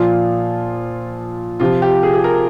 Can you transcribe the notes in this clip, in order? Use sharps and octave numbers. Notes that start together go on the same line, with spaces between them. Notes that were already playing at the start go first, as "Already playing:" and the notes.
Already playing: A#2 F3 F4
C3 F3 F4
G4
G#4
G#4
A#4